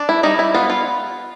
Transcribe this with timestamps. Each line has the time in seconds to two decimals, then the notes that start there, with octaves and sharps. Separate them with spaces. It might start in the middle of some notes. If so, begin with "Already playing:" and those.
Already playing: D4
0.09 E4
0.23 G3 D#4
0.39 E4
0.54 B3 F4
0.70 F4